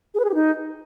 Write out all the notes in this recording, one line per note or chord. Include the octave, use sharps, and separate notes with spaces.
G#4
B4
G#4
G4
D#4